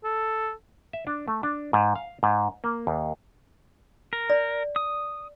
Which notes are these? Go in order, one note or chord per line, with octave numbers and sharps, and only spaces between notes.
A4
E5
D4
A3
D4
G#2
F5
G#2
A#3
D#2
A#4
D5
D#6